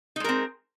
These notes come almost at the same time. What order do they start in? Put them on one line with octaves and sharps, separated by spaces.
D#4 G#3 A#4 C4